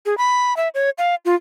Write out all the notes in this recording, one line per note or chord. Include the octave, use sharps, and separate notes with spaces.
G#4
B5
E5
C#5
F5
F4